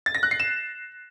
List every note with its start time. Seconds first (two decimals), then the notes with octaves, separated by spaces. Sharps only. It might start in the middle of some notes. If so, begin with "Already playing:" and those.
0.06 A6
0.15 A#6
0.23 F#6
0.31 C7
0.40 E7